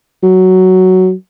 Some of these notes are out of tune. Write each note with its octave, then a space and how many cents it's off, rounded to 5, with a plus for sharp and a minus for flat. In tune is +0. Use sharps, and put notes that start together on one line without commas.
F#3 +5